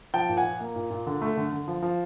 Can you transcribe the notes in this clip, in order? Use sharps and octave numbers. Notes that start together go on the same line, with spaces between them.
F3 G5 A5
A#2
F#5 G#5
A#2
A#3
A#2
A#2
D3
A3
D3
D3
F3
F3